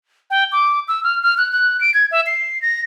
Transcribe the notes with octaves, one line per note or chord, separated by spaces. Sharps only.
G5
D6
E6
F6
F6
F#6
F#6
D7
G#6
E5
C7
A#6